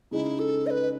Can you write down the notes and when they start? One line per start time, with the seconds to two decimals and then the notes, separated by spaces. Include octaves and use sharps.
0.11 C#3 G#3 D#4 E4
0.39 A4
0.66 D#5
0.70 B4